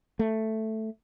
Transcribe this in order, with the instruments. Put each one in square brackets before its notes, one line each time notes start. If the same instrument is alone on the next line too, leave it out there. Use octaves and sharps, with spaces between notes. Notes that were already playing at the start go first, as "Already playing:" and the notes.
[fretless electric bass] A3